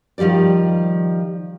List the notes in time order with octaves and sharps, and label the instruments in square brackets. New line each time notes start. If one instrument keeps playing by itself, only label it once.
[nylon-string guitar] D#3 F3 G3 G4 D5